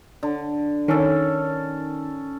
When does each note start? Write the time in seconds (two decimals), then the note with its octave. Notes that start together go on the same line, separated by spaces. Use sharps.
0.23 D3
0.88 D#3 C#4 A4